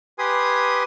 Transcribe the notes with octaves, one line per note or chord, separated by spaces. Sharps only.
G4 B4 G#5 C6 D#6